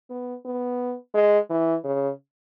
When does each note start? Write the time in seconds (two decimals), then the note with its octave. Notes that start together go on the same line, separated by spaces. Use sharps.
0.09 B3
0.45 B3
1.14 G#3
1.50 E3
1.84 C#3